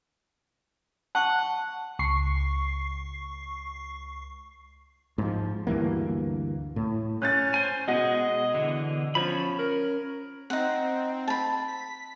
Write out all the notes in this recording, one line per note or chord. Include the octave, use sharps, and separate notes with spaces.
F#5 A5 C#6
C#2 C#6 C7
G#2 F3
D2 G2 E3 A#3
A2
C#4 F#6 G6 A6
C5 G#5
B2 G#3 G#4 D#5 F#5 A#6
D3 E3
F3 C#4 C#5 B5
A#4
C4 D#4 F#5
A5 B5
B6